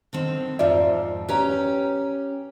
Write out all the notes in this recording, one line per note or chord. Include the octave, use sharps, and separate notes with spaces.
D3 D#3 C4
F2 G#2 F3 F4 D5 E5
C#4 G4 B4 C#5 A#5